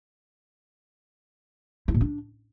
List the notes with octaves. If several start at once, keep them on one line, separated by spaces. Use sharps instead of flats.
E4
A#2
D4